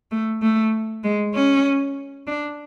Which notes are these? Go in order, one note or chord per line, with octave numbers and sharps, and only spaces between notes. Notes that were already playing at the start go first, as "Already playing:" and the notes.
A3
A3
G#3
C#4
D4